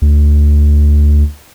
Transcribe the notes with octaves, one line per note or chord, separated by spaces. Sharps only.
D2